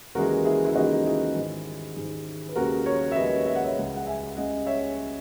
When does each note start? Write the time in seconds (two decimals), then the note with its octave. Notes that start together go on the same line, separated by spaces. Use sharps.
0.15 D#2 C#3 E3 G#3 F#4 A#4
0.45 E4 G#4
0.65 E4
0.75 D#2 C#3 E3 G#3 D#4 F#4
1.05 E4 G#4
1.35 G#2 D#3 G#3
1.96 G#2 D#3 G#3
2.49 B4
2.56 D#2 C#3 G#3 F#4 A#4
2.86 A#4 C#5
3.11 E5
3.16 D#2 C#3 G#3 B4 D#5
3.46 E5
3.55 F#5
3.64 C#5 E5
3.76 C#2 C#3 G#3
3.96 F#5
4.06 E5 G#5
4.36 C#2 C#3 G#3 D#5 F#5
4.66 C#5 E5